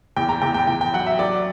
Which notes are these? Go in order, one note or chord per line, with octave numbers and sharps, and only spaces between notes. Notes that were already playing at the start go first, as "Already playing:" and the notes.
E2 G5
A#5
E2 G5
G5
E2 G5
G5
F#3 F#5
E5
F#3 D5